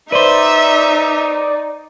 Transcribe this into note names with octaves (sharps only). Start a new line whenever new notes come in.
D#4 B4 C5 D5 E5